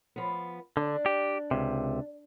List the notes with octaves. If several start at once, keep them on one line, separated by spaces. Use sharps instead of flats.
F3 B3
D3 D4
G4
C#2 C3